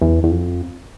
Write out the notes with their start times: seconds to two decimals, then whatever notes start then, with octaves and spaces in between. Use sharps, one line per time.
0.01 E2
0.24 E2
0.31 F2